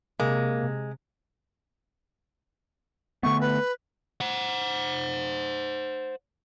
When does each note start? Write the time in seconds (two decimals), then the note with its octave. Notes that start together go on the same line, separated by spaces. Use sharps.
0.20 C3 G#3 A#3
3.23 D3 A3 B3 C#6
3.40 B4
4.21 C5 F#5